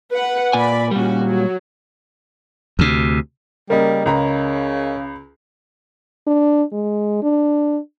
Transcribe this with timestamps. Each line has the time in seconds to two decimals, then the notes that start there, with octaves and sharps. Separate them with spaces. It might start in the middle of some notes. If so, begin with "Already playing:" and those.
0.13 B4 F#5
0.53 A#2 D5 G#5 B5
0.91 A#2 G3 C#4 F#4
1.24 F#3
2.79 D2 C3
3.70 C#3 G3 A#3 A#4 D#5
4.06 C#2 C#3 A#5 B5
6.27 D4
6.72 G#3
7.23 D4